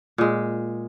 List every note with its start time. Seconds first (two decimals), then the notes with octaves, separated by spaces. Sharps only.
0.18 A#2 G#3